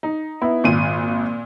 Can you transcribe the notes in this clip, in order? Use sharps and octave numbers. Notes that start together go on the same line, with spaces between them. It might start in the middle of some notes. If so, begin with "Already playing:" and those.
D#4
B3 E4
G#1 A#2 D#7